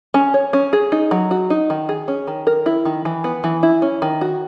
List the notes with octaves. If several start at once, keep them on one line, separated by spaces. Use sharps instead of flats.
C#4
C#5
C#4
G#4
D#4
F#3
F#4
D#4
D#3
G#4
C#4
D#3
A#4
E4
D#3
E3
B3
E3
E4
C#4
D#3
F#4